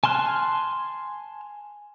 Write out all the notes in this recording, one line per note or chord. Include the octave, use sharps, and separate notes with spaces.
G#5 A5 C6 F6 F#6